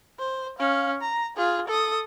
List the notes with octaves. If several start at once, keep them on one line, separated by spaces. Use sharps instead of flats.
C5
C#4 F5
A#5
F4 G#4
A4 D#6